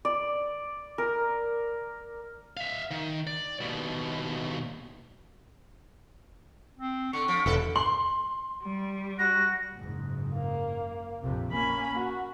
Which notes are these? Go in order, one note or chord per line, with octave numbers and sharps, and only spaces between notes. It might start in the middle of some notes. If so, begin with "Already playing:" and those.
D5
A#4
E5 F5
D#3
D5
D#2 B2
C4
D3 C#6
F3
E1 D#2 A4 B4
C6 F#7
G3
F#4 A#6
F#1 G#2
A#3
A#1 F2 C3
A#3 C#4 G#5 B5
F#4